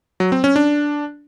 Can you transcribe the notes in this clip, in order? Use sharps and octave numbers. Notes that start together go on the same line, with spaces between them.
F#3
C4
C#4
D4